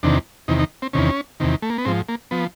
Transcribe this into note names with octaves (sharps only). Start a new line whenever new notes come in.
E2 C3 D#3 D4
E2 C3 D#3 D#4
D#4
C4
E2 C3 D#3 C#4
E2 C3 D#3
A3
A#3
B3
G#2 F3 C4
A#3
F3 B3